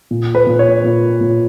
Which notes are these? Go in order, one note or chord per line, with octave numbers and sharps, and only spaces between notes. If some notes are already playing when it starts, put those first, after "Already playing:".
A#2
B4
A#2
C#5
A#2
A#2